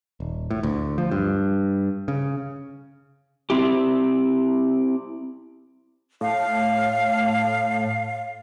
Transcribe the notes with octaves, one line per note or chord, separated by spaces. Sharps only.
D#1
A2
D2
F3
G2
C#3
C4 E4 G4
A2 F5